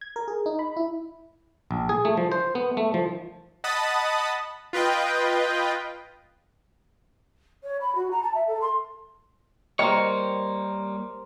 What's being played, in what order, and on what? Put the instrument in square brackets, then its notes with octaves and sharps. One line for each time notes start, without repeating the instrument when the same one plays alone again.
[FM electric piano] G#6
A#4
G#4
D#4
B5
E4
[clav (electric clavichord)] A#1
G#4
A3
F3
C5
B3
A3
F3
[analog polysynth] D#5 F#5 A5 B5 D#6
F4 B4 D#5 G5
[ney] C#5
B5
F#4
A#5
A5
E5
A4
C6
[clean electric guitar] G3 A#3 C#5 [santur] A#4 C5 [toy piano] D#5 G5 A#5